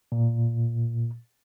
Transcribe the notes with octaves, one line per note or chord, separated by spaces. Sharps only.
A#2